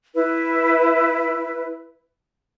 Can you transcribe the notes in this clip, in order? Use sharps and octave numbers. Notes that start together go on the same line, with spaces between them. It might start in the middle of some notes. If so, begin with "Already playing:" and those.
E4 B4